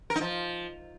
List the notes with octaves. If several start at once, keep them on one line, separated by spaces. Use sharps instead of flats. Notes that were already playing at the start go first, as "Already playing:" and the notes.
A#4
D#4
F3